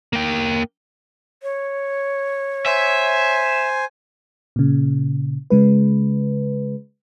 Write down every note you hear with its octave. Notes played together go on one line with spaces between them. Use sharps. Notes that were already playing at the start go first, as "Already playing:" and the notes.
A#3 G5
C#5
C5 E5 G#5
A#2 C#3
C#3 G#3 B4